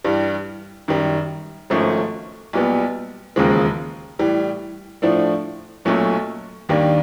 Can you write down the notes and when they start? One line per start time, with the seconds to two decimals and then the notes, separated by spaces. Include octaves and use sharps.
0.05 G2 E3 G3
0.88 F#2 D#3 G3
1.70 G#1 G#2 F3 A3 C#4
2.53 B1 A#2 G3 B3
3.36 E1 D#2 C#3 F3 G#3
4.19 A2 E3 G3
5.02 A2 F3 A3 D4
5.85 B1 A#2 F#3 A3 C#4
6.69 D#2 D#3 G3 A#3 D4